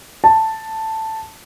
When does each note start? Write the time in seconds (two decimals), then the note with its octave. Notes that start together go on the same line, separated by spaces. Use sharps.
0.24 A5